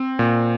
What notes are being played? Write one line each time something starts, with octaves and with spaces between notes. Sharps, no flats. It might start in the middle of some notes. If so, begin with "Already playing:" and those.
Already playing: C4
A#2